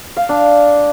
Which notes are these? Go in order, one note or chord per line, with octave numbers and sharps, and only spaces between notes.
F5
D4